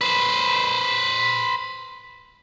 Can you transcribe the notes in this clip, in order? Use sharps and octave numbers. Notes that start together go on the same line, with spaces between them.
B4 C5